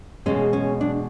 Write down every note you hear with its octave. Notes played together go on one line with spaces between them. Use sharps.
E2 B2 G#3 C#4
C#4
D4